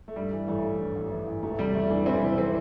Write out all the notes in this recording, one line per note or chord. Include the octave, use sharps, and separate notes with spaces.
A3
G2 G3
E3
A1 A3
A1
G2
A1
E3
A1
E1 A3
C3 G3
E2 A3
E3 A3 D4
E2 C4 E4
C3
E3 C4 E4